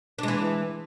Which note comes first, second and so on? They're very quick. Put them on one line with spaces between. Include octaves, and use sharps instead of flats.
D4 G#3 E3